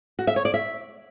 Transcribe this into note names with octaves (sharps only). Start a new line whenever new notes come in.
F#4
E5
C#5
D5
E5